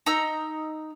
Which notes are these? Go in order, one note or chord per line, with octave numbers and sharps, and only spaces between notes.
D#4 A#5 E6